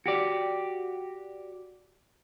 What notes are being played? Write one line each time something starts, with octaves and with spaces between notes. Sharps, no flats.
F#4 G4 D5